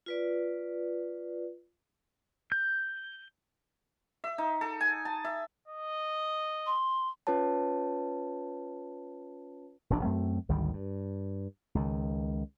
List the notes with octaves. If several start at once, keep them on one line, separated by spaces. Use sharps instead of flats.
F4 B4 D5
G6
E5
D#4
A4
G#5
A5
E5
D#5
C6
C#4 F4 B4 C#5 A5
E1 A#1 F2 D4
F#2 A3 C4
G#1 D2 D#3 G3
G2
C#2 D#3